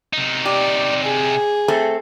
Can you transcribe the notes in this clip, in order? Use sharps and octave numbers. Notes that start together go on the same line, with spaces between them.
C3 D#4
G4 D5
G#4
A3 C4 A4